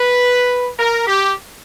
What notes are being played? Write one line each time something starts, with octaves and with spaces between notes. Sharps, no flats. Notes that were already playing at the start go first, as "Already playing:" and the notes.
Already playing: B4
A#4
G4